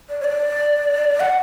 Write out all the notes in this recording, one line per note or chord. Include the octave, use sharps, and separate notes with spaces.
D5
C#5
D5
F#5